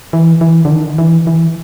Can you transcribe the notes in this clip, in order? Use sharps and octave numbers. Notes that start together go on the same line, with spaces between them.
E3
E3
D3
D#3
E3
E3